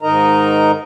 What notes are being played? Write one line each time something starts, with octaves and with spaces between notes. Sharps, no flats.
G#2 D#3 D#4 A#4 D#5 A#5